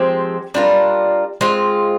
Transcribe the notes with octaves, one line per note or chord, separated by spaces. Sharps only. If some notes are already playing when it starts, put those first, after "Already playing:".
Already playing: F3 G#3 C4 G4
G3 D4 F4 A#4
G#3 C4 F4